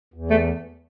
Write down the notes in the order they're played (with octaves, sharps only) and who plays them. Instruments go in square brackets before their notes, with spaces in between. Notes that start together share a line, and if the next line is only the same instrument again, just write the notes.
[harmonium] E2
[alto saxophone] A3